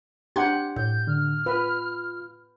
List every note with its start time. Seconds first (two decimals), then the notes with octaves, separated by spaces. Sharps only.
0.36 D4 G4 F#5 C6 G#6
0.76 A2 G6
1.07 D3 F6
1.46 F4 B4